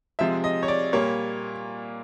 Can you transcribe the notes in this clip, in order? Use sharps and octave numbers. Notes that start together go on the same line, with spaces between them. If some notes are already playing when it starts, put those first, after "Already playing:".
C3 F3 G#3 E5
D#5
C#5
D5
A#2 G3 A#3 C#5